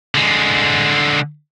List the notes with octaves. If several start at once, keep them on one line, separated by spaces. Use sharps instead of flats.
D3 G#3